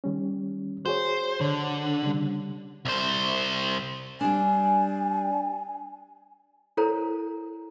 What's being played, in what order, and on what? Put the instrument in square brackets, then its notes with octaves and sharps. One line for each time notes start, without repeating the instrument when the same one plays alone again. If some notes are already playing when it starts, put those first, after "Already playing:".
[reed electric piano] D#3 G3 C#4
[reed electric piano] F#4 G#4 C#5 [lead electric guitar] C5
[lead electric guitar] D3 [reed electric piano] C#5
[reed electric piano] C#3 G3
[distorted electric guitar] C2 C5
[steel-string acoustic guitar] G3 D4 [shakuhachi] G#5
[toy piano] E4 A4 A#4 C5 C#5 A#5